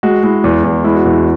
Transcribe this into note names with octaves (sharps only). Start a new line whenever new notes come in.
G#3 F#4
G#3 E4
E2
E2
G#3 E4
F#4
E2 E4
F#4